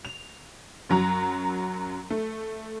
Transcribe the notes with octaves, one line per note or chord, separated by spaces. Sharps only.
F7
F#2 F#3 A#5
A3